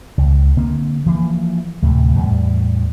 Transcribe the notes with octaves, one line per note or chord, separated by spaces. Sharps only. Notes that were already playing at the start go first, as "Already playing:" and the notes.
C#2
D3 A#3 C4
E3 F3 A3 A#3
D2 A2 C3
E2 A2 G3